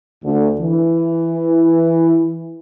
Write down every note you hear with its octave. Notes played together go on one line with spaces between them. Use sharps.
D2
E3